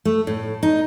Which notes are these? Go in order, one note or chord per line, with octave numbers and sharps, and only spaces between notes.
A3
A2
D#4